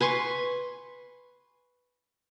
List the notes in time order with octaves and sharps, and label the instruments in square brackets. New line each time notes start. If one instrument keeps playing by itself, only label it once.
[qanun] B4 G#5 C6 C#6